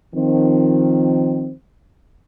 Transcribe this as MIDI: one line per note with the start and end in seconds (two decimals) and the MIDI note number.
0.15 1.52 51
0.15 1.52 53
0.15 1.52 60